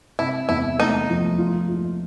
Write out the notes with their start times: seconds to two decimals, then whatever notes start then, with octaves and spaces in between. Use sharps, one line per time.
0.19 C3 E4
0.49 E2 E4
0.79 A3 D#4
1.09 F3
1.38 F4
1.69 F4